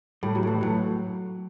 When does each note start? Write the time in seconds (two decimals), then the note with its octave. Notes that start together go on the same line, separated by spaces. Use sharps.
0.23 A2 G3
0.35 F#3
0.43 A2 E3
0.61 A2 F#3